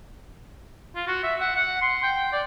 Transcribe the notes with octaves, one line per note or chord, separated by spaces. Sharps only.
F4
F#4
E5
F#5
F#5
C6
G5
D5